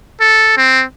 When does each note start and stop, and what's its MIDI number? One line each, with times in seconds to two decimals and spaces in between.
0.21 0.53 69
0.58 0.84 60